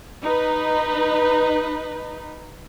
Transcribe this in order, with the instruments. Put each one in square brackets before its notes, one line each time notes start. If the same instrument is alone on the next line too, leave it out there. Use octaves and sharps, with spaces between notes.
[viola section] D#4 B4